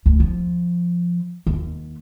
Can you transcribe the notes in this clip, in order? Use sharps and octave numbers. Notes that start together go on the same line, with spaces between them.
D2
F3
D#2